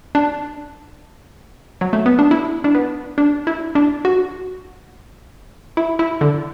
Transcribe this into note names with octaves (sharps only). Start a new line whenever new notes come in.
D4
F#3
A3
B3
D4
E4
D4
B3
D4
E4
D4
F#4
E4
E4
D3